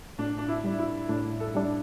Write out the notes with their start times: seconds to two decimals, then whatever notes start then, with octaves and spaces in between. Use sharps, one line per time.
0.19 A2 D4
0.38 D4
0.48 E4
0.64 G3 D4
0.79 E4
1.09 A2 D4
1.40 A4
1.55 G3 D4